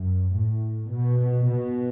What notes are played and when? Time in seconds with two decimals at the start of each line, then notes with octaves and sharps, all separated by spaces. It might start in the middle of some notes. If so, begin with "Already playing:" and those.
Already playing: F#2
0.36 A2
0.91 B2
1.47 B2